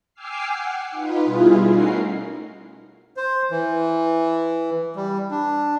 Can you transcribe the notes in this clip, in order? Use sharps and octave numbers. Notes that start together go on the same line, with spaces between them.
G5 G#5 D6 E6 F6 C7
F#5
D#4 F4 B4
B2 G3 E4 F4 G#4
A3 C#4 D#4 F#4 A#4 C7
C5
E3
G3
D4